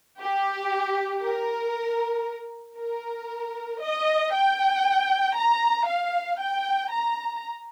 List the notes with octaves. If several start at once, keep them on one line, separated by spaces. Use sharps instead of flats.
G4
A#4
A#4
D#5
G5
A#5
F5
G5
A#5